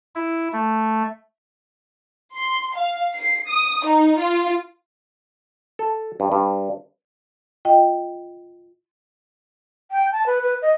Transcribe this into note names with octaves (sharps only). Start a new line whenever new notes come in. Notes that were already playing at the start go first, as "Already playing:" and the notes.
E4
A3
C6
F5
C7
D#6
D#4
F4
A4
G2
G2
F4 D#5 G5
G5
A5
B4
B4
D#5